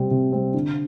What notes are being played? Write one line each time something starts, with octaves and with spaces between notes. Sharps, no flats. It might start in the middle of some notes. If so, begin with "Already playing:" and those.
Already playing: C3 G3 C4
C3
G3 C4
D3